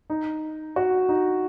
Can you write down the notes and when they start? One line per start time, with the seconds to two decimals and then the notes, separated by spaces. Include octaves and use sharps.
0.10 D#4
0.76 F#4
1.09 D#4